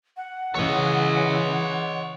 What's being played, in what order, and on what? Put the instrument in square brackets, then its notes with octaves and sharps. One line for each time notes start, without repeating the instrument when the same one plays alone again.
[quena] F#5
[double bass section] C#3 E3 [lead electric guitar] C#5 D#5